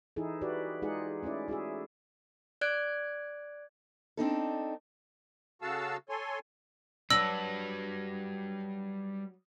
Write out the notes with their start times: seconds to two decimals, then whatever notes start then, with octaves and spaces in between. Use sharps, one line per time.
0.16 E3 D#4 E4 G#4 A4
0.41 E4 F#4 G4 B4 D5
0.82 G#3 D#4 F4 G#4 D5 F#5
1.23 A3 C#4 E4 D5
1.48 E4 F#4 G#4 E5
2.61 D5 F#6 G#6 D7
4.17 C4 D4 D#4 A4
5.62 C#3 F#4 A4 F5 A5 E6
6.09 A4 C#5 G#5 C6
7.10 F#3 G3 D4 B4 E6 A#6 F#7